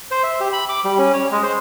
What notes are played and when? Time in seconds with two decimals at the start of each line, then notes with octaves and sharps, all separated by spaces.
0.11 C5
0.23 E5
0.40 G4
0.53 B5
0.69 D6
0.84 G3
0.98 C#4
1.13 C#5
1.31 G#3
1.43 C5